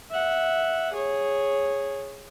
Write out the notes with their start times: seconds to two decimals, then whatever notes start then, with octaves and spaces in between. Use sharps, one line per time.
0.11 E5 F#5
0.93 G#4 C#5